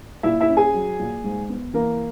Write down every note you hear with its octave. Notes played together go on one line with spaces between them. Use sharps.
A#2 E4 E5
E4 E5
C#4
G#4 G#5
F#3
A#2
G#2
B3
E3 A#3 A#4